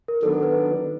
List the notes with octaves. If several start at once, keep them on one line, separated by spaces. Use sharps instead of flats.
A#4
D#3 F#3 B3 D4 A4
B4